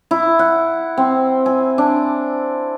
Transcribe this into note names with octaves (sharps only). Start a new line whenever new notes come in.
E4
F#5
C4
G#5
D4